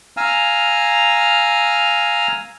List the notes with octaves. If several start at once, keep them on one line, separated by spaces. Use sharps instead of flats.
F5 G#5 A#5 E6 F6